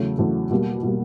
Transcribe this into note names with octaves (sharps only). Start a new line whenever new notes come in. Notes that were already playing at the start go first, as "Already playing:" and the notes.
Already playing: E2 C#3 F#3 A3
E2 C#3 F#3 A3
B2 G3 A#3
B2 G3 A#3